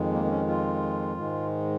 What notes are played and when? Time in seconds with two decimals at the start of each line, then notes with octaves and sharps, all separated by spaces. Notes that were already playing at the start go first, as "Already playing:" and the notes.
Already playing: F2 D#3 G#3
0.12 A#3
0.24 A#3
0.29 C#4
0.47 F4
1.17 G#2 D#3 G#3